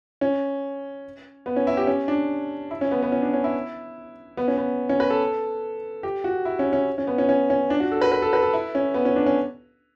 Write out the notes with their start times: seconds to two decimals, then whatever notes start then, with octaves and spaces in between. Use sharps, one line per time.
0.21 C#4
1.46 B3
1.56 C#4
1.67 E4
1.77 G4
1.87 C#4
2.08 D4
2.71 E4
2.81 C#4
2.91 B3
3.02 B3
3.12 C#4
3.22 D4
3.33 C#4
3.44 E4
4.37 B3
4.48 C#4
4.57 B3
4.89 C#4
5.00 B4
5.10 A4
6.03 G4
6.24 F#4
6.45 E4
6.59 C#4
6.73 C#4
6.98 C#4
7.07 B3
7.18 C#4
7.29 C#4
7.50 C#4
7.70 D4
7.80 F#4
7.92 A4
8.01 B4
8.12 B4
8.22 A4
8.33 B4
8.43 A4
8.53 E4
8.75 C#4
8.94 B3
9.05 C#4
9.16 D4
9.26 C#4